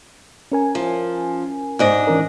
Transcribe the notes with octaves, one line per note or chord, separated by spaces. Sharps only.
C#4 A#4 G#5
F3
G#2 D4 D#5
E3 C#4 A#4